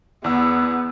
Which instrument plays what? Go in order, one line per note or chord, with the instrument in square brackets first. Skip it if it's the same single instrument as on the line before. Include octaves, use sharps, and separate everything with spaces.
[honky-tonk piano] E2 E6 [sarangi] B3